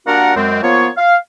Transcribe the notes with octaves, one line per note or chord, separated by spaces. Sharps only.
G3 A#3 D4 F#4 A#4 F#5
F#2 G#3 C4
F3 A#3 B3 F4 C#5
F5